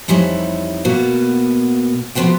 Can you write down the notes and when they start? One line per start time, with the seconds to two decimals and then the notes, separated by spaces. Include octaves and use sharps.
0.08 F2 E3 G3 D#4 E4 C#5
0.85 B2 A#3 B3 F#4
2.15 F2 F3 F#3 B3 F#4 G5